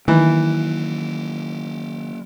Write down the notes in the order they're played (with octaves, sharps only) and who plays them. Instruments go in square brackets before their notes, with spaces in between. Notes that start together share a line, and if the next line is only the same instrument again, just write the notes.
[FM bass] D#3 [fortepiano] E3 [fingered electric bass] F#3 A#3